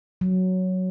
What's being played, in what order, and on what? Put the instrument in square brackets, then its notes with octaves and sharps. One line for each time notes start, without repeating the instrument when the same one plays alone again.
[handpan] F#3